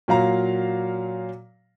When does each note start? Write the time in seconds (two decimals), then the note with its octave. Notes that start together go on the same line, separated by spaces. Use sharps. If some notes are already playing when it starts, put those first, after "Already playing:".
0.08 A#2 F#3 F5 A#5